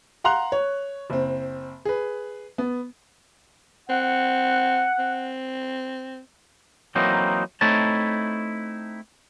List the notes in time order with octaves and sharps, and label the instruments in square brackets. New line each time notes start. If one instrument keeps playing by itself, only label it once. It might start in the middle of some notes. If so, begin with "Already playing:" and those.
[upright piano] F5 F#5 A#5 C6 F#6 F7
C#5
F#1 C4
G#4 B4
B3
[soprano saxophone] C4 [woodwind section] F#5
[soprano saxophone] C4
[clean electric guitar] E3 F#3 A#3 C4 D#4
A3 C4 D#4 E4 C#5 A5